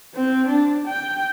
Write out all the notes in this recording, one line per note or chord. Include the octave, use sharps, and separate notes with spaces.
C4
D4
G5